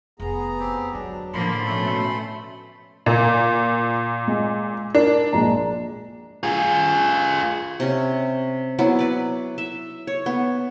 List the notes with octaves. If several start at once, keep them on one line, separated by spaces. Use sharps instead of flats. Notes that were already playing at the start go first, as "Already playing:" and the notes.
F1 D#3 B3 G#4 A#5
C4 G4
D3 F#3 G#3 D4
A2 D3 F3 A#3 B5 C6
B2 A3 C#4
A#2 A#3
G#3
D4 A#4
A#1 G#3 A#5
F4 G#4
C3 C#4
F#3 B3 E4
B4 D5
E5
C#5
B3